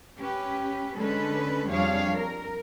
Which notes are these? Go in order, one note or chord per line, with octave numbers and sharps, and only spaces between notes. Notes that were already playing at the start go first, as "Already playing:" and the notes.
C#4 G4 B4
D3 G#3 C#4 D4 A4 B4
F2 G3 D4 G#4 C#5 F5
A#4